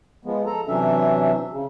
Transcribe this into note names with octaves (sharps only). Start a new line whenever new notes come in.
F3 G#3 B3
A4 A#5
C3 E3 F#3 C#4 D4 E5
C#3